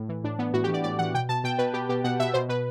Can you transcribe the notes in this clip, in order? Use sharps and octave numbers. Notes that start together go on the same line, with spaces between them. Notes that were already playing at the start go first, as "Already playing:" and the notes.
Already playing: A2
E3
A2 D4
E3 B3
A2 F#4
G4
E3
D5
A2 D5
E3 F#5
B2 G5
B2 A5
B2 G5
B2 B4
B2 G4
B2 G4
B2 F#5
B2 E5
B2 C5
B2 B4